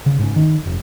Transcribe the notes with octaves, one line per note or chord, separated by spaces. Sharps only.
C#3
G#2 C#4
D#3
F1